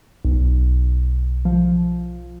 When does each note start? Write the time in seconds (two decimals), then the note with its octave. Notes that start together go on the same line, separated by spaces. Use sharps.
0.25 B1
1.45 F3